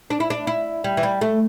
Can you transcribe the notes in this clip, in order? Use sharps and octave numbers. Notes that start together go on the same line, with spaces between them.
D4
E4
D4
E4
G3
E3
G3
A3